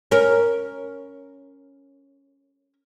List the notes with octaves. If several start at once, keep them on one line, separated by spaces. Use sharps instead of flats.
C#4 A#4